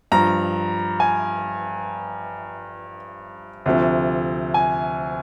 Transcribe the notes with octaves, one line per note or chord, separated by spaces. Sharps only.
G2 F3 A#5
G#5
D2 C3 F3
G#5